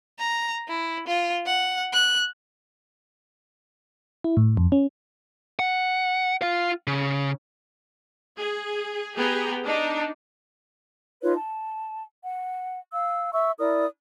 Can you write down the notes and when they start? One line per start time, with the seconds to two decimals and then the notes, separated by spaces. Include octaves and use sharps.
0.19 A#5
0.68 E4
1.07 F4
1.46 F#5
1.93 F#6
4.24 E4
4.37 A2
4.57 F2
4.72 C#4
5.59 F#5
6.42 F4 F5
6.87 C#3
8.38 G#4
9.16 B3 G4 G#4 G5 A#5
9.63 D4 D#4
11.22 D#4 F4 B4 C#5
11.35 A5
12.23 F#5
12.94 F5 E6
13.34 E5 C#6 E6
13.59 E4 A#4 D5 D#6